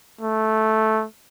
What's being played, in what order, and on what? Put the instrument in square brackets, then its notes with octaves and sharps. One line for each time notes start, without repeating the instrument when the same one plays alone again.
[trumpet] A3